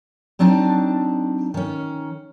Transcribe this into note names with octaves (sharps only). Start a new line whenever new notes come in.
F#3 C4 D4 D#4 A5
D#3 C#4